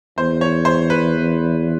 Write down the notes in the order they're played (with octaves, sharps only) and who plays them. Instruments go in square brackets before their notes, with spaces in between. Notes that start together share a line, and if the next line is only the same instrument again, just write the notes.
[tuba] E2 [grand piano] C5
[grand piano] C#5
C5
B4